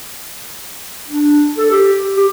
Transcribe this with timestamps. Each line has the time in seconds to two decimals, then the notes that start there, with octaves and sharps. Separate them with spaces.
1.09 D4
1.58 A4
1.71 G4
2.17 G4